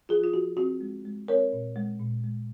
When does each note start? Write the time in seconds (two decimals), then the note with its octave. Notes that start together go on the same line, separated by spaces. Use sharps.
0.09 F3 F4 G#4
0.24 F4
0.34 F3 F#4
0.57 C4 F#4
0.81 G#3
1.05 G#3
1.28 C4 A#4 C#5
1.53 A#2
1.76 G#3
1.99 A#2
2.24 G#3